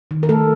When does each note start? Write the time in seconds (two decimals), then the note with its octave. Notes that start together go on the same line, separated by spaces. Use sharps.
0.11 D#3
0.23 A#4
0.29 A3 A4